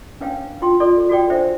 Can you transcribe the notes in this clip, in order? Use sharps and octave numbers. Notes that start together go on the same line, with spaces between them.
C#4 D4 B4 C#5 F5 G5
F4 G5 C6
F4 A4 D5 C6
F#4 A4 D5 G5
D4 C5 E5 G5